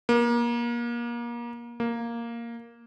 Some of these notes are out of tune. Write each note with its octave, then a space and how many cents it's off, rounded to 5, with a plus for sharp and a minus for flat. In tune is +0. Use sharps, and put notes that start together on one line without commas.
A#3 +30
A#3 +0